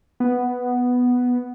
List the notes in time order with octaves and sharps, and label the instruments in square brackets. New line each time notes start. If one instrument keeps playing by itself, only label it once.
[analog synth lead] B3